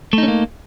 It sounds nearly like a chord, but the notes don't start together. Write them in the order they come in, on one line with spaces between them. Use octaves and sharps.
A3 D#4 C#4 A#3